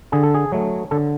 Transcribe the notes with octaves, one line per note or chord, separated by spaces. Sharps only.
D3 G#4
A4
G#4
F#3 A3
D3 A4